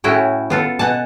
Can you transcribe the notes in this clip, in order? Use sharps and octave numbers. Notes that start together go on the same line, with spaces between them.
A2 C#4 E4 F#4 G5
B3 F4 A4
B2 F#5 G#5 A5